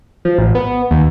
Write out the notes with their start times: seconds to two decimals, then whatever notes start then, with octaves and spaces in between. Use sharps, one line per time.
0.25 F3
0.38 A1
0.55 B3
0.91 D#2